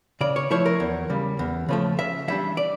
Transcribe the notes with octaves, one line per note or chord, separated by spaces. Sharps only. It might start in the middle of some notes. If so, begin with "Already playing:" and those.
C#3 D5
C#5
F3 A3 E4 C#5
A#4
E2
C#3 G3
E2
C#3 F3 A3
C#3 E5
E3 G3 D4 E5
D5